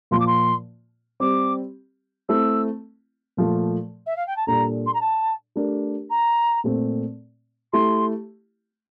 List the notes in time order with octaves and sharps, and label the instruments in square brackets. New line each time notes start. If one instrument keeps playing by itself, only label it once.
[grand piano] A#2 F3 A#3 F4 [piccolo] C6
[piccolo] D6
C6
[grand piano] G3 C4 G4 [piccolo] D6
[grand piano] A3 C4 E4 [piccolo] E6
[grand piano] A#2 F3 A3
[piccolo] E5
F5
G5
A5
[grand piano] A#2 G3 D4 A4 [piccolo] A#5
[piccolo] C6
A#5
A5
[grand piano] A3 D4 G4 A#4
[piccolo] A#5
[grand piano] A#2 A3 C4
[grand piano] A3 E4 G4 [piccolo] C6